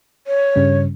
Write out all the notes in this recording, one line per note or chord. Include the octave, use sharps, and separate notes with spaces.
C#5
G2 C#3 G3